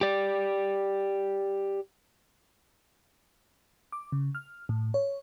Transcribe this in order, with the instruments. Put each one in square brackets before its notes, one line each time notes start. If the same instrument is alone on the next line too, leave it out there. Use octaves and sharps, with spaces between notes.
[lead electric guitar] G4 D5
[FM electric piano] D6
C#3
F6
A2
C#5